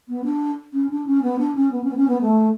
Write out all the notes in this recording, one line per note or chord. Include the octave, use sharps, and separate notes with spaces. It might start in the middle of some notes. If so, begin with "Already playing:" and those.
B3
D4
C#4
D4
C#4
B3
D4
C#4
B3
C#4
B3
C#4
B3
A3